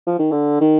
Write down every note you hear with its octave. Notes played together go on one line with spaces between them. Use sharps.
F3
D#3
D3
D#3